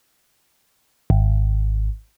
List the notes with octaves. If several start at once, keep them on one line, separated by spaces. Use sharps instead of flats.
G#1